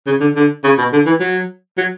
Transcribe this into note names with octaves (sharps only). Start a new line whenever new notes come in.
C#3
D3
D3
C#3
B2
D3
E3
F#3
F#3